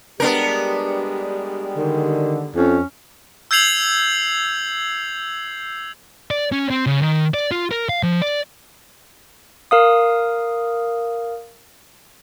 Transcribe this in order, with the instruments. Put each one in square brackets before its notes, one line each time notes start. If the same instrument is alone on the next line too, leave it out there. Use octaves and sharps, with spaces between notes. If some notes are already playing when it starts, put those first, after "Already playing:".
[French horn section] G3 G#3 G4 [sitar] B3 D4 A#4
[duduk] D3 [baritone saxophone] D#3
[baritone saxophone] F2 [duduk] C#4
[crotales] E6 G6 G#6 C7 F7 F#7
[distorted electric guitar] D5
C#4
C4
C#3
D#3
D5
F4
A#4
F5
F3
D5
[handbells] A#4 F5 D#6